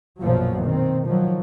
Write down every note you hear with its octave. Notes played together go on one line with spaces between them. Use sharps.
A#1 F#2 B2 F3 F#3
D#3 C4
D#3 F3 F#3